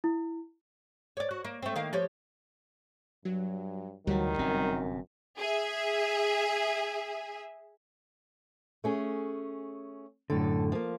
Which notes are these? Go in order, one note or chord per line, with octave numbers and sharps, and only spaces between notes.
E4
C#5 D5
F#4
A#3
A3 C4
D#3 A#3 F5
F3 G4 C#5
G2 F#3
D2 D#3 E3 F#3 G3
G1 F#2 C3 C4
G#4 E5
A3 C#4 G#4
F#2 A2 D3 A4
F3 A#3